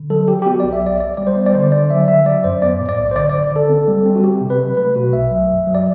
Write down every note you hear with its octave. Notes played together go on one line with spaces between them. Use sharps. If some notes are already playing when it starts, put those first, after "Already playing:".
Already playing: D3
F#3 A4
F#3 G4
G4
B3 F#4
B1 D5
E5
B1 D5
C2 D5
G3 D5
C5
B3
D5
D3 C5
D3 D5
F#3 E5
D3 E5
F#3 D5
F#2 C5
B3 D5
A2
D5
B1
C5
D3 D5
G1 D5
D3 A4
C4
G3
C4
F#4
C4 G4
C3
B4
F#3
A3 B4
B2 F#4
B1 E5
F#3
F#2
F#3
D5